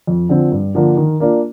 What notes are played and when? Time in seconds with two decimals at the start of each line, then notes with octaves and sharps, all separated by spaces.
0.07 F2
0.29 D3 F3 C4
0.52 G2
0.75 D3 F3 A#3
0.97 D#3
1.20 A#3 D4 F4